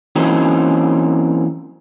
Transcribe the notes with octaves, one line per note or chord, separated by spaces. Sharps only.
E3 F#3 A#3 C4 C#4 D#4